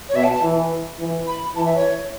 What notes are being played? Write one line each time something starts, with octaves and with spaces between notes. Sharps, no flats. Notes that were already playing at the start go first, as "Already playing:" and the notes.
C#5
B2 E5
A5
A5
E3
E3
B5
E3 A5
E5
C#5